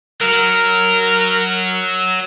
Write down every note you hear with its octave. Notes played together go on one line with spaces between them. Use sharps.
F#3 A#4